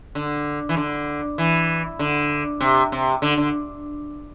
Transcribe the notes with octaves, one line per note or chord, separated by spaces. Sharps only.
D3
E3
D3
E3
D3
C3
C3
D3
D3